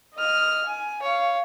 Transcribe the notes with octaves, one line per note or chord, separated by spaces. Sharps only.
D#5 F6
G#5
C#5 F5